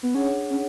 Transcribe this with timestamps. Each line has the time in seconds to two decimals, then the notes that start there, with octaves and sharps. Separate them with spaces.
0.03 B3
0.15 C#4 D4 G#4 C#5 F#5
0.50 C#4